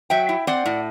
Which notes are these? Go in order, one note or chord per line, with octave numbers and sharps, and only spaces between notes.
F#3 E5 G5
E4
C4 D5 F#5
A2